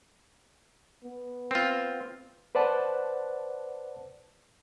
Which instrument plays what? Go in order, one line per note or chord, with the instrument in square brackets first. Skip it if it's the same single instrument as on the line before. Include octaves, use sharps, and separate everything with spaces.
[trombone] B3
[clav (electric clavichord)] C4 F4
[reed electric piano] B4 C5 D5 F#5 A5